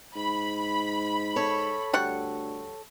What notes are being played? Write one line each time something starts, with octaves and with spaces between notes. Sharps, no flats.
G#2 B5
A4 C#5
D2 G3 F#5 C#6